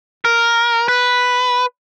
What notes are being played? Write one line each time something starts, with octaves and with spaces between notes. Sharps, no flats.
A#4
B4